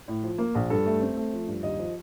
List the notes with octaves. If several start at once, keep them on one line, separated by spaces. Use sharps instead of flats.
A2
F3
A#3
A#1
G2 A4
A3
C4
A3
F3
G2
D#2 D#5
F3